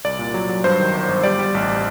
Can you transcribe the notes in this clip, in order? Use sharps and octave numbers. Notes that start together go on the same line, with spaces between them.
C2 D5
A#2
F#3
F#3
G2 C5
D#3
G1
G1
G3 D5
G3
A1